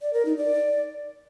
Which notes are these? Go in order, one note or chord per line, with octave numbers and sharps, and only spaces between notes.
D5
A#4
D#4
D5